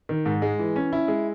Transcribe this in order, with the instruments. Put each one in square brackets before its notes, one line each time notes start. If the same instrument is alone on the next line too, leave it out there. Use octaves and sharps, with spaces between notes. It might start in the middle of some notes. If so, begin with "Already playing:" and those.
[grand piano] D#3
G#2
G#3
E3
C#4
E4
G#3